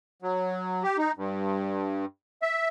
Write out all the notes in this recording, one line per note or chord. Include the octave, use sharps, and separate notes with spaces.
F#3
G4
D#4
G2
E5